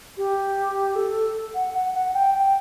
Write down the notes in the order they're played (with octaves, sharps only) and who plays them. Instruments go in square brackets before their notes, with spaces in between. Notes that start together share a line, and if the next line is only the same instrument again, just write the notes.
[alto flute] G4
A4
F#5
F#5
F#5
G5
G5